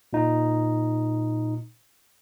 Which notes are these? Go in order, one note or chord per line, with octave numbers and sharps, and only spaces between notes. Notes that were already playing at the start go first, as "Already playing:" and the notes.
A#2 D#4